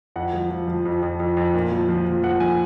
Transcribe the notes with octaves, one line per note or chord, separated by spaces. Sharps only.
F2 F#5
F3
F3
F3
F2
F2
F2
F2
A#2
F3
F3
F3
F3 F#5
F3 G#5